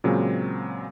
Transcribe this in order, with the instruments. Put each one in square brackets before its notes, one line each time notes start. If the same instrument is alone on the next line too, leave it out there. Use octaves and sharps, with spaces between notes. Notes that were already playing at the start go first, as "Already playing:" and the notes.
[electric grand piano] A#2 C#3 F#3 G#3 C4